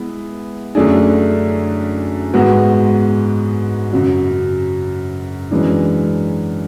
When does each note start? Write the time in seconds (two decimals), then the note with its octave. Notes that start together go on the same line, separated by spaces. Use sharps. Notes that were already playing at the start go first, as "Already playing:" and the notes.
Already playing: G#3 B3 E4
0.75 F#2 D3 A3 D4 G#4
2.34 G#2 G#3 B3 F#4
3.93 F#2 C#3 F#3
5.51 F#2 E3 G#3 D4